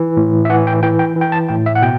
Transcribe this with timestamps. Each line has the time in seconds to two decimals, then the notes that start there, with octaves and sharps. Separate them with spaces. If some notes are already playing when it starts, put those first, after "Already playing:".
Already playing: E3
0.17 A2
0.45 E5
0.49 E3 F#5
0.67 G5
0.83 E3 G5
0.99 G5
1.16 E3
1.21 G5
1.32 A5
1.49 A2 G5
1.66 E5
1.75 F#5
1.82 B2 G5